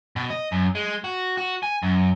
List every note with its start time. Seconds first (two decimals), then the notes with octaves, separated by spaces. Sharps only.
0.16 B2
0.30 D#5
0.52 F#2
0.75 G#3
1.04 F#4
1.37 F#4
1.63 G#5
1.83 F#2